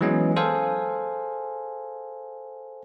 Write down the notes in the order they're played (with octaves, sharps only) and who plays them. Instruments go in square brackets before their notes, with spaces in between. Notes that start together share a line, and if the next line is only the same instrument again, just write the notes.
[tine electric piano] E3 F#3 G#3 B3 C#4
G#4 A4 C5 F5 G#5